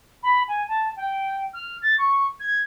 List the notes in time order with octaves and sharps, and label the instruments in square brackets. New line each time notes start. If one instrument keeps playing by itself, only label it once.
[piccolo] B5
G#5
A5
G5
F6
A6
C#6
G#6